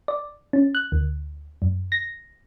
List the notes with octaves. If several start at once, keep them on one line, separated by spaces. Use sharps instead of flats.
D5
C#4
F#6
D2
F#2
A#6